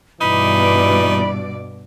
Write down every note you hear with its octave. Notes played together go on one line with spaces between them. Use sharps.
G2 B2 E3 D#4 D5 B5